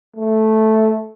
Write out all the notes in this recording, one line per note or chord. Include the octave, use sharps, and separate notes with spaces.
A3